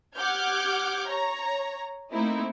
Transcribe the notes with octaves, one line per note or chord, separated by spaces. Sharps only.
G4 F#5 D6 F6 G6 G#6
C#5 A#5
A3 A#3 C4 D#4 E4